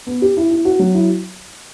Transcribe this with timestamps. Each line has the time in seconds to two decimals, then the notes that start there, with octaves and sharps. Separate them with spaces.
0.07 B3
0.22 G4
0.37 E4
0.51 E4
0.65 F#4
0.79 F#3
0.94 E4